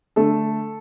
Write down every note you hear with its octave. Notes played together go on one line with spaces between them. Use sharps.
D3 A3 A4